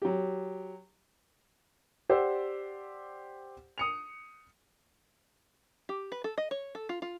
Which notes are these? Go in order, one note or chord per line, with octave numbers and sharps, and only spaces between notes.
F#3 G4
G4 C5 D5 F#5 E6
D#6 C#7 F7
G4
B4
A4
D#5
C#5
A4
F4
F4